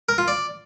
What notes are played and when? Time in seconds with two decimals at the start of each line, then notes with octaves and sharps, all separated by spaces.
0.09 A#4
0.18 F4
0.28 D5